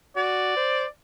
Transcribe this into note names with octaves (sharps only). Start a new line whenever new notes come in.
F#4 D5
C5